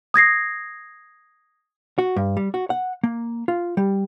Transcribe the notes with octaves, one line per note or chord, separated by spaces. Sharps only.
D#6 G#6 A#6 C7
F#4
G2
G3
F#4
F#5
A#3
F4
G3